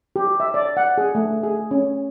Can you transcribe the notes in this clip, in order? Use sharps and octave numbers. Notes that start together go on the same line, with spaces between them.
G4
E5
D5
F#5
G#4
A3
G#4
C#4